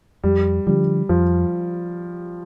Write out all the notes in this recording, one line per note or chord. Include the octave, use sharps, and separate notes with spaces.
F2 G3
D3 F3 G3
F2 F3